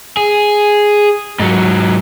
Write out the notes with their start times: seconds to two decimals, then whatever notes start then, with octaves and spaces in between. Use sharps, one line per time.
0.17 G#4
1.39 G#2 F#3